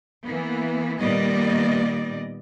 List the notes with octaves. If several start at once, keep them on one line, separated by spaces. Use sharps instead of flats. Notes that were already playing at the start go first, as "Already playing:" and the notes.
E3 A#3 B3
A#2 D#3 G3 B3 D5 D#5